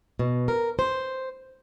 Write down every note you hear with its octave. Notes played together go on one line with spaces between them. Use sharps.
B2
A#4
C5